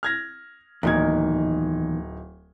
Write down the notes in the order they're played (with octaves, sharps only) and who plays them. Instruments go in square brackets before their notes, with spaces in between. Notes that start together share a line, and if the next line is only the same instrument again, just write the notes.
[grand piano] F6 G#6 A#6
[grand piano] D1 D#4 G#6 [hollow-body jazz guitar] E2 A#2 D#3